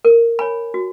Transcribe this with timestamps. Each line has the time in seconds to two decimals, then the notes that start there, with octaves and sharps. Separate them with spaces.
0.05 A#4
0.39 C#5 G#5 B5
0.74 F#4